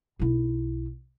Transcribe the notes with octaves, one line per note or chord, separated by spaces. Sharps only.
B1 E4